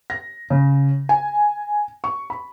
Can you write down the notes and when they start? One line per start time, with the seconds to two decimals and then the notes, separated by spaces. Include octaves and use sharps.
0.10 A#6
0.50 C#3
1.09 G#5
2.04 C#6
2.30 B5